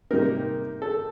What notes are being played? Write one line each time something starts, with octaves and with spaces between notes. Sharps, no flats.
C3 G3 A#3 D#4 A#4
A4